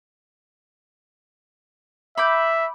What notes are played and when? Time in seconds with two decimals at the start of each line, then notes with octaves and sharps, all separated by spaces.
2.18 E5 B5 D6 G6